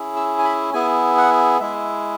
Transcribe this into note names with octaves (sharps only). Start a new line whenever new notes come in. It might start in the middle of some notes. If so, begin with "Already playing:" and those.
Already playing: C#4 E4 G#4
E6
G#5
B5
B3 E4 G#4 G#5
F#5
G#3 E4 G#4 E5